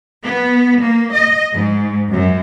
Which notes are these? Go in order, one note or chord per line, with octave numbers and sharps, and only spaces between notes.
B3
A#3
D#5
G#2
F#2